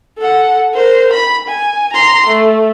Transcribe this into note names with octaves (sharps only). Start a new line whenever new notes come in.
A4 F#5
A#4 C5
B5
G#5
A#5 C6
A3